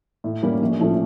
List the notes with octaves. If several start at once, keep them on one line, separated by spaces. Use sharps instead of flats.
A2
G3 A#3 C#4
A#1
A2 F3 A3 C#4